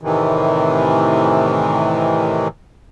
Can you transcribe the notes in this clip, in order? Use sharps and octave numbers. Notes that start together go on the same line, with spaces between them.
A2 C3 D#3 E3